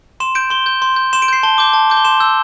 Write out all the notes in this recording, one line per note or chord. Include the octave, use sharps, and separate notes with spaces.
C6 E7
G6 D7
C6 G7
G6
C6
G6
C6 E7
D7
G6 C7
A5 G7
D6 G6
A5
D6 G6
G7
C6 E7
E6 G6